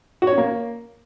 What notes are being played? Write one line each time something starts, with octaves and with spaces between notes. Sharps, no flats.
F#4
C#5
C#4
A#3